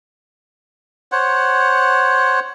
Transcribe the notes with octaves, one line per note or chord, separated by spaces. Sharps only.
C5 C#5 F#5